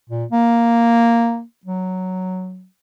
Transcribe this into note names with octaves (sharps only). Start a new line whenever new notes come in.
A#2
A#3
F#3